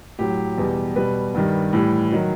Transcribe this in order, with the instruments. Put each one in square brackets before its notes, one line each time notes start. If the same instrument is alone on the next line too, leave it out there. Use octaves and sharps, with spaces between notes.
[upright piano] A2 F#3 G4
E2 B2 G3
B2 G3 B4
G2 D#3 G3
A2 E3 G3
D#3 F#3